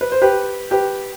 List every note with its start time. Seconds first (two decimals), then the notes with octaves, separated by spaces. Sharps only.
0.01 B4
0.12 C5
0.22 G4 B4
0.71 G4 B4